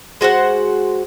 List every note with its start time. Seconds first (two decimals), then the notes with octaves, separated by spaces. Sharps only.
0.21 G#3 F#4 C5 F#5